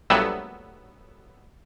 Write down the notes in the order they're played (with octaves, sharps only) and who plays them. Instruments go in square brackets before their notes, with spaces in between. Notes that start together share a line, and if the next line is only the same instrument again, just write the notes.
[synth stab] A#1 F#3 G3 A3 B3 E6